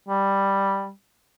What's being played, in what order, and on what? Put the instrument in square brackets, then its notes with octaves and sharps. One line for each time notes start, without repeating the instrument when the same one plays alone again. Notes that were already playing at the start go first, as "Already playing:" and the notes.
[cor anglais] G3